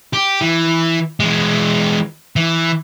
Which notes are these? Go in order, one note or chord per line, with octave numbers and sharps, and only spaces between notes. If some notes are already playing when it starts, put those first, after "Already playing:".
G4
E3
E3 G#3
E3